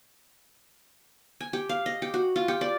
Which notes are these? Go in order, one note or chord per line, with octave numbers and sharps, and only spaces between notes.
G#5
G4
F5
D#5
G4
F#4
F4
G4
D5